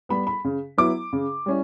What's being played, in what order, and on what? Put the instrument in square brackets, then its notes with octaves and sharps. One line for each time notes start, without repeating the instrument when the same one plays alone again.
[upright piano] G3 B3 B5
B5
C#3
F#3 B3 E4 D6
C#3
G3 C#4 E4